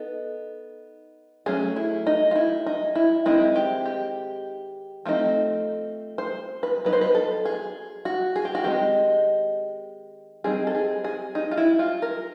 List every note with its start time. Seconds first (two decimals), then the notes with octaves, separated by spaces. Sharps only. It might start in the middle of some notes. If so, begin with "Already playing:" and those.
Already playing: B3 D#4 A4
1.46 F#3 A3 C#4 G#4
1.76 E4
2.07 D#4
2.31 F4
2.35 E4
2.66 D#4
2.95 E4
3.26 D#3 G#3 C4 D#4 E4
3.56 G4
3.85 G4
5.05 F3 A3 C4 D#4
6.18 C5
6.63 B4
6.85 F#3 B3 D#4 B4
6.93 C5
7.01 B4
7.15 A4
7.45 G#4
8.05 F#4
8.36 G#4
8.45 G4
8.55 F#4
8.64 D#3 G#3 C4 D#4 G4
10.44 G3 C4 D#4 G#4
10.67 A4
10.75 G#4
11.04 G#4
11.35 D#4
11.51 F4
11.57 E4
11.79 F4
12.02 A#4